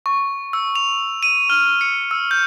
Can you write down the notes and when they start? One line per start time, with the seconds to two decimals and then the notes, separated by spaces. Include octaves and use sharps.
0.06 C#6
0.53 E6
0.76 F7
1.23 D#7
1.50 F6
1.81 C#7
2.11 E6
2.31 G6